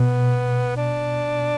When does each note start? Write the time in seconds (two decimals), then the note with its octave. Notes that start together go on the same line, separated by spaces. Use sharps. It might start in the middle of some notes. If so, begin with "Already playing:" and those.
Already playing: B2 B3
0.76 D4